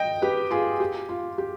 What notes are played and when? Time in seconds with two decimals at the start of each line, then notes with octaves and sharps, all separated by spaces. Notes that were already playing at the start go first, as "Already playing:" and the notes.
Already playing: D#5 G5
0.22 G4 B4
0.51 F4 G#4
0.80 G4
1.09 F4
1.38 G4